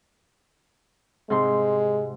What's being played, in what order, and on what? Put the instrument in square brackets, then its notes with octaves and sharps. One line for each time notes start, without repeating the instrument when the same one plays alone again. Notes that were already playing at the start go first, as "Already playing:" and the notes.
[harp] G#2 C3 C6 [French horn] G#3